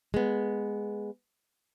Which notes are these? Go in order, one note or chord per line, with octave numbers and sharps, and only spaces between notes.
G#3 B3